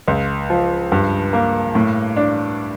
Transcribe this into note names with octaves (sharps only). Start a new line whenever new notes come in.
C#2
F3
G2
A#3
A2
D4